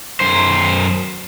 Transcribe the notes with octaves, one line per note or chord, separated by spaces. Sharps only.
F#2 C5